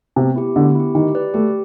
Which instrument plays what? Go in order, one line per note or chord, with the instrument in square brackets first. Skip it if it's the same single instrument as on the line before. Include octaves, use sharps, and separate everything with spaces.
[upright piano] C3 [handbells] B3
[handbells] E4 G4
[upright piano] D3 [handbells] B3
[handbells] E4 G4
[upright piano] D#3 [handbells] G4
[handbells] B4 D5
[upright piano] A3 [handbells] G4